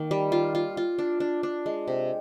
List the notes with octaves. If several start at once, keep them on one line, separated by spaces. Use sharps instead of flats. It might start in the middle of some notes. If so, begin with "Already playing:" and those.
Already playing: D#3 A#3
G3
F4
F4
F4
D4
D4
D4
G#3
C3